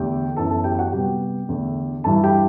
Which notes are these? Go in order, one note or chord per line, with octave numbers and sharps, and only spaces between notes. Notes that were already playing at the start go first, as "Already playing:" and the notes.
Already playing: E2 D3 A3 G4 G5
F#2 E3 B3 A4 A5
A4 A5
G4 G5
G5
F#4 F#5
C3 G3 B3 G4 G5
E2 D3 A3
G2 E3 G3 A4 A5
G4 G5